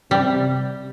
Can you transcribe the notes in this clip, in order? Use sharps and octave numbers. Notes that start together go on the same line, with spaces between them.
C3 G3